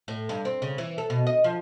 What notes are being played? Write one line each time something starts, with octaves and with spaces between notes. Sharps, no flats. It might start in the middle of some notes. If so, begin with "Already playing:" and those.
A2
G2
C4
C#3
E3
A4
B2
D#5
F3